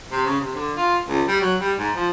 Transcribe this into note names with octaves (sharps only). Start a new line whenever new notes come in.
C3
C#3
C3
D3
F4
C#2
G3
F#3
G3
G#2
F3